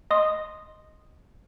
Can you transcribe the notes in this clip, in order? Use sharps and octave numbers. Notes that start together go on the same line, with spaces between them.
D#5 C6 D#6